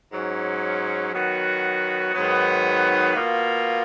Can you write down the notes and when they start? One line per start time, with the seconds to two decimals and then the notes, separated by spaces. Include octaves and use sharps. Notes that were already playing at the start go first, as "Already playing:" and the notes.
0.11 G#2 F#3 C#4
1.13 D#3 F#3 B3 F#4
2.14 G#2 D#3 F#3 B3
3.15 B2 A#3 F4